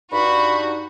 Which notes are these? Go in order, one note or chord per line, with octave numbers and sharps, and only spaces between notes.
G2 D#4 F#4 B5